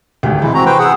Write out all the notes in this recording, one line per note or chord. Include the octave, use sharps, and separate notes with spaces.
G#1 D2 G4
C3 E3 G#3 E4 G#4
C4 F#4 A#5
B4 C5 G5
G#4 F#5 G#5 E6